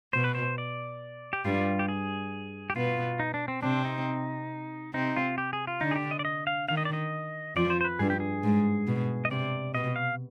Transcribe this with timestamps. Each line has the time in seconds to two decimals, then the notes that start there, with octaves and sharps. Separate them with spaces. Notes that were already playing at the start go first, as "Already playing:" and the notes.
0.13 B2 C5
0.24 B4
0.35 C5
0.58 D5
1.33 G4
1.45 G2 G3 F4
1.79 G4
1.89 G#4
2.70 G4
2.76 B2 B3 F4
3.20 D#4
3.34 D4
3.48 C4
3.63 C3 C4 D4
3.85 D#4
4.94 C3 C4 D#4
5.17 F4
5.38 G4
5.53 G#4
5.67 F4
5.81 D3 D4 D#4
5.91 G#4
5.96 G4
6.11 D#5
6.19 D5
6.25 D#5
6.47 F5
6.68 D#3 F5
6.77 D#5
6.85 D5
6.93 D#5
7.56 F2 F3 D5
7.70 C5
7.81 C5
7.85 B4
7.99 G2 G#4
8.10 G4
8.20 G#4
8.44 G#2
8.87 B2
9.25 D#5
9.31 C3 D5
9.75 B2 D#5
9.96 F5